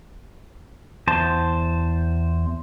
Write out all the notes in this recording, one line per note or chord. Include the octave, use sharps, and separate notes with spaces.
E2 C5 A5